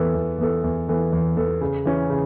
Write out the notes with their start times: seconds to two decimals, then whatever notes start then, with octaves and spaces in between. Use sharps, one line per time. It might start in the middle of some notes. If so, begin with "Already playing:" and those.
Already playing: E2 E3 B3 A4
0.15 E2
0.38 E3 B3 A4
0.64 E2
0.88 E3 B3 A4
1.13 E2
1.37 E3 B3 A4
1.61 C#3
1.85 E3 C#4
2.10 C#3